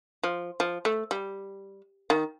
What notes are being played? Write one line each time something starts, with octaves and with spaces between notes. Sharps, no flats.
F3
F3
A3
G3
D#3